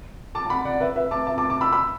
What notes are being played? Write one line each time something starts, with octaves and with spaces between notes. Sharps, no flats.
A5 D6
A5
F#5 B5
D5 F#5
B4 E5
B4 E5
A5 D6
E5 A5
A5 D6
A5 D6
B5 E6
B5 E6